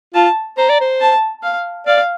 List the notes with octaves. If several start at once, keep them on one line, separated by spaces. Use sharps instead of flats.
F4 A5
C5 A#5
D5
C5
A5
F5
D5 F5